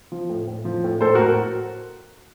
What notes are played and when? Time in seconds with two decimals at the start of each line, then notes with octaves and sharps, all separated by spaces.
0.12 F3
0.29 A2
0.48 A2
0.65 F3
0.84 A2
1.01 A2 A4 C5
1.15 A2 F#4 A#4